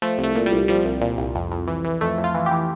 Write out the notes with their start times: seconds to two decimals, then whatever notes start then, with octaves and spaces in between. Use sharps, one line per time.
0.02 F3 A3
0.18 C2
0.24 A3
0.35 A#2
0.46 G3
0.52 C2
0.68 F3 G3
0.85 C2
1.01 A#2
1.18 C2
1.35 F2
1.51 F2
1.68 E3
1.85 E3
2.01 F2 A3
2.18 F2
2.24 F4
2.34 E3
2.46 E3 G4